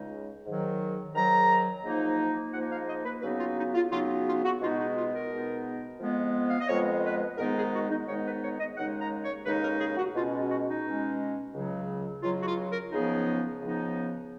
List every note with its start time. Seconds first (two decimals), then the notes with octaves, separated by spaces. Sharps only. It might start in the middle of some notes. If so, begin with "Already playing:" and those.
Already playing: C#2 C#3 G#3 D#4
0.46 G#2 D#3 F#3
1.14 G#2 D#3 F#3 A#5
1.83 G#2 F3 A#3 D#4
2.52 G#2 F3 A#3 D#4 F#5
2.71 F5
2.88 D#5
3.05 B4
3.22 C#3 F#3 B3 D#4 B4
3.39 F4
3.57 D#4
3.74 F4
3.91 C#3 F#3 B3 D#4 F4
4.26 F4
4.44 F#4
4.61 B2 G#3 B3 D#4 F4
4.78 D#4
4.95 F4
5.12 A#4
5.29 B2 G#3 B3 D#4
6.00 F2 F3 G#3 B3
6.49 F5
6.60 D#5
6.68 F2 F3 G#3 B3 C#5
7.03 B4
7.37 G#2 D#3 G#3 B3 D#4 A#4
7.55 G#4
7.72 F#4
7.90 D#4
8.07 G#2 D#3 G#3 B3 D#4 C#5
8.25 B4
8.42 C#5
8.58 D#5
8.76 D#2 C#3 G#3 D#4 F#5
8.99 A#5
9.22 C#5
9.45 D#2 C#3 G#3 D#4 B4
9.63 A#4
9.79 G#4
9.97 F#4
10.15 B2 G#3 C#4 F4
10.49 F#4
10.67 D#4
10.83 B2 G#3 C#4
11.53 C#2 C#3 F#3
12.22 C#2 C#3 F#3 F4
12.39 F#4
12.46 F4
12.69 A#4
12.91 C#2 C#3 F3 B3 D#4 G#4
13.61 C#2 C#3 F3 B3 D#4